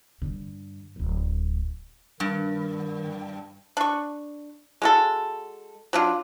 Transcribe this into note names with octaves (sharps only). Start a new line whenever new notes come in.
G2 D3
D1 G#1
G2 D#3
D4 C#6
G#3 F#4 A4
F#3 D4 F4